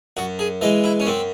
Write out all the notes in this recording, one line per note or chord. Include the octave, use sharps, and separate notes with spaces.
F#2 F#4
G#4
E3 G#3 D#5
E4
C#4
F#2 C4